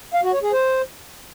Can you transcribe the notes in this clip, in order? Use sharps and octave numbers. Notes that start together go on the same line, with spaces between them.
F5
F#4
C#5
G#4
C5